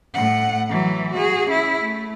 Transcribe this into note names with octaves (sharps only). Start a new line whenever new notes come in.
A2 F#5
E3 F#3
F#4 G#4
C#4 E4
A3